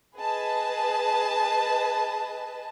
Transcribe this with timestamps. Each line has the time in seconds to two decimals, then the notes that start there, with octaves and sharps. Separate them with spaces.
0.16 G#4 B4 D#5 A5